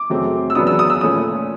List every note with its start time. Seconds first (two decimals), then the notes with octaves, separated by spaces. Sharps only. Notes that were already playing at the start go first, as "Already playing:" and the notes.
Already playing: D6
0.10 F#2 C#3 F#3 A3 C4
0.50 E6
0.55 E2 C#3 F#3 B3 D4 D#6
0.67 E6
0.79 D#6
0.90 E6
1.01 A#2 F3 A3 C#4 D#6